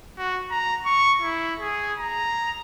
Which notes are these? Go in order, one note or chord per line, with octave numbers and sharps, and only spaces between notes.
F#4
A#5
C#6
E4
G#4
A#5